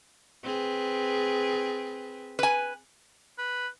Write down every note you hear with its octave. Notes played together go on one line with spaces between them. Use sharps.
C4 G#4 B4
B4 G#5
B4